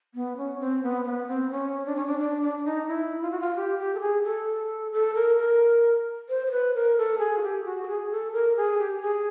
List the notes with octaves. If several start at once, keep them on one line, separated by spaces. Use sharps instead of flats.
B3
C#4
C4
B3
B3
C4
C#4
D4
C#4
D4
D4
D4
D#4
E4
F4
F#4
F4
G4
G4
A4
G#4
A4
A4
A#4
A#4
C5
C5
B4
A#4
A4
G#4
F#4
G4
F#4
A4
G#4
A4
A#4
G#4
G4
A4
G#4